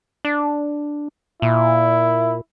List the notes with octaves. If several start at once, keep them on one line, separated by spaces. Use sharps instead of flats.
D4
A#2 E4